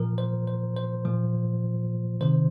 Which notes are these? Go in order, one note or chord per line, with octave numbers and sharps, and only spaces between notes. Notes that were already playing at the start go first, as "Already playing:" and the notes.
Already playing: A#2 F3 A#4
C5
C5
C5
A#2 F3
C3 D#3 C5